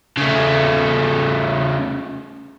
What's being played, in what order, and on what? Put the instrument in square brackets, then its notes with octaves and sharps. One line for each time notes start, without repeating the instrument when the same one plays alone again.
[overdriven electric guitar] C#3 A3